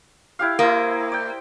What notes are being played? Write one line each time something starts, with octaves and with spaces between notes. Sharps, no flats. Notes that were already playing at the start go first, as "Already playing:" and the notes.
E4 G4 F5
A#3 E4 C5 D#5
D5 G5